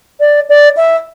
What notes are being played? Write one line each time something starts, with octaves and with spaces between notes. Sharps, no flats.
D5
D5
E5